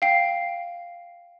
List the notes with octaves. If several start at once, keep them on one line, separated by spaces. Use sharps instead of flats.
F5 G5 C7